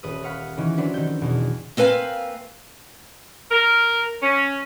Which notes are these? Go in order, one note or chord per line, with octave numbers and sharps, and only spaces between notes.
D#1 B4 D#6
C#5 F5 F#5 B5
D#3 E3 C#4
F#3 C4 D4 F#4 B4
D#3 C4 G6
E2 B2
A#3 C4 B4 F5 G#5
A#4
C#4